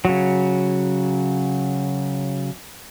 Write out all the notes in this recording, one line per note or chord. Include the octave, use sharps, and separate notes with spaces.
C#3 F#3